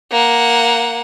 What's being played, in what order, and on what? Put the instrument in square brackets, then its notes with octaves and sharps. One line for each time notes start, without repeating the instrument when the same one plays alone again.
[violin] A#3 F#5